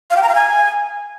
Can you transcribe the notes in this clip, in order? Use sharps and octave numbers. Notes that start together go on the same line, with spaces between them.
F5
G5
A#5
F5
G#5